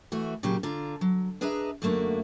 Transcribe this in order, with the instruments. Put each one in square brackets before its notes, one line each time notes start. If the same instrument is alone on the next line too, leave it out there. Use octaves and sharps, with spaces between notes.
[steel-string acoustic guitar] E3 A3 F#4
A#2 C#3 F#3 C#4 G4
D3 F4 A#5
F#3
D4 G#4 B4 D#5 E5 A#5
F#2 D3 A3 A#3 F#4